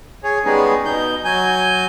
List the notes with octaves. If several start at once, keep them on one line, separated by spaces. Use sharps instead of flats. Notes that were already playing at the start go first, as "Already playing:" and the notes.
G#4 C#5
G3 G#3 B3 C#4 D#4 G#4
B2 D#4 G6
F#3 G#5 G6